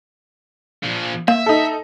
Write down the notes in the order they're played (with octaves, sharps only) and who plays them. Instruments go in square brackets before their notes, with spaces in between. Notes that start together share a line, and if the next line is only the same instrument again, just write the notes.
[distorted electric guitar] A#2 F3
[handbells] A#3 [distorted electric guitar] E5
[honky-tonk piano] D#4 A4